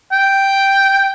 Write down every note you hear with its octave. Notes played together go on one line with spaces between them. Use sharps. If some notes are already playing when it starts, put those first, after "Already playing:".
G5